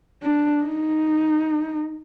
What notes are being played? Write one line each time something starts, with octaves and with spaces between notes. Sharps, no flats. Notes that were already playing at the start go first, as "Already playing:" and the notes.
D4
D#4